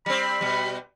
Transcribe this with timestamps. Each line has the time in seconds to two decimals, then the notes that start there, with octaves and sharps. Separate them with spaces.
0.06 G3 C4 B5
0.41 B2 G3